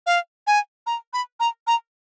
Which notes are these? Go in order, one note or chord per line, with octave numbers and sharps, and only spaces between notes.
F5
G#5
A#5
B5
A#5
A#5